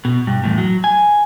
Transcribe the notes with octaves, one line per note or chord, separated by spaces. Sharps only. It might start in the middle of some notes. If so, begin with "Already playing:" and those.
B2
G2
E2 A2
F#3
G#5